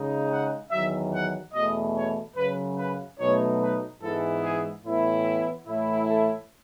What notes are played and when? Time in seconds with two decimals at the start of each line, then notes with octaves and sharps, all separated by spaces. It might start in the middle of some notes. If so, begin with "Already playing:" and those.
Already playing: C#3 G#3 D#4
0.30 F#5
0.71 E2 D#3 F#3 E5
1.12 F#5
1.53 E2 B2 A3 D#5
1.95 C#5
2.36 F#2 C#3 F#3 B4
2.78 B4
3.19 B2 F#3 A3 D#4 C#5
3.61 B4
4.01 G#2 E3 G#3 B3 E4 A4
4.43 G#4
4.85 A2 E3 B3 E4
5.67 A2 E3 A3 E4
6.08 A4